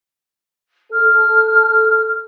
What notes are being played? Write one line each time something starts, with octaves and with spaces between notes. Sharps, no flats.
A4 F6